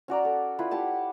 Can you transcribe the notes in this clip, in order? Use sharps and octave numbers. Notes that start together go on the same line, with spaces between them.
C#4 F#4 D5 A#5
A4
E4 F4 B4
E4 G4 F#5 A5